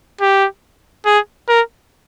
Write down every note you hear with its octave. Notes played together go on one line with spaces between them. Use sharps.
G4
G#4
A#4